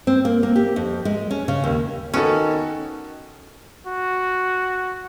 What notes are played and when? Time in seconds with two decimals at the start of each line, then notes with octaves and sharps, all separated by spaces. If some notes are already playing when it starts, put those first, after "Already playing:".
0.07 C4
0.25 A#3
0.43 A#3
0.56 G4
0.76 F2
1.05 G#3
1.31 C#4
1.48 C#3
1.64 D#2
2.14 D#3 B3 C#4 F#4 A4
3.87 F#4